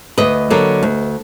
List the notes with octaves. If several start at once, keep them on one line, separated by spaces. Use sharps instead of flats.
D2 B4 D#5
D3 F#3 A#3
D2